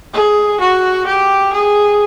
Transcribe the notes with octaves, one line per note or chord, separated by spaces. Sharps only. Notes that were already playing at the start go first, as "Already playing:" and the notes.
G#4
F#4
G4
G#4